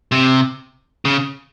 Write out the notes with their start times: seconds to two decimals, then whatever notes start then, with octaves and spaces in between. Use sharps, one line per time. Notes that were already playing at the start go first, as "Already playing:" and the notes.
0.12 C3
1.05 C#3